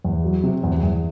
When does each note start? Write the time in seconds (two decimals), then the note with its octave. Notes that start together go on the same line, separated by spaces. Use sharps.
0.05 E2
0.24 F#3
0.44 C3
0.63 E2
0.83 E2